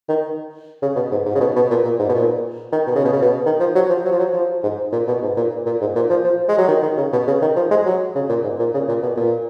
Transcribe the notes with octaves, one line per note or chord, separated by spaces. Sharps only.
D#3
C#3
B2
G#2
G#2
C#3
B2
B2
A#2
A#2
G#2
B2
A#2
D#3
B2
C#3
B2
C#3
B2
D#3
F3
F#3
F3
F#3
F3
F#3
F3
G#2
A#2
B2
G#2
A#2
A#2
G#2
A#2
F3
F3
G#3
F#3
D#3
D#3
C#3
B2
C#3
D#3
F3
G#3
F#3
C#3
A#2
G#2
A#2
C#3
A#2
B2
A#2